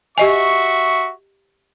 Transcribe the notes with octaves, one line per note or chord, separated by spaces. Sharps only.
F#4 G4 D#5 E5 G#5 C#6